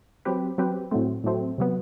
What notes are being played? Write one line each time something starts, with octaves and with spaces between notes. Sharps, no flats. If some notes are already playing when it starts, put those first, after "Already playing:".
F#3 C4 G4 B4
F#3 C4 G4 B4
A2 F#3 A3 C4
A2 F#3 A3 C4
C3 F#3 B3